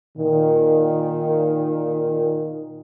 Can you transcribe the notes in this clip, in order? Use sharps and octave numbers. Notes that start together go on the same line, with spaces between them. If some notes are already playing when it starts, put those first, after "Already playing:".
A#2 D#3